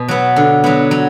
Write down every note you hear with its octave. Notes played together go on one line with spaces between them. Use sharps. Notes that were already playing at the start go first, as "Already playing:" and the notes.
Already playing: B2
F#3 B3
D3
F#3 B3
F#3